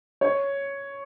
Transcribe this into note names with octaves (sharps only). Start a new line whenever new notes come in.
C#5